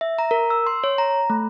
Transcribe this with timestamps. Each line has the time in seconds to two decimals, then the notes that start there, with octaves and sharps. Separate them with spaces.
0.01 E5
0.19 A#5
0.31 A#4
0.50 E6
0.66 C6
0.84 C#5
0.98 A#5
1.30 A3